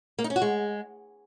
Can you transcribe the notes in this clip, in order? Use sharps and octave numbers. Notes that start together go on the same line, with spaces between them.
A#3
D#4
C#4
F#4
G#3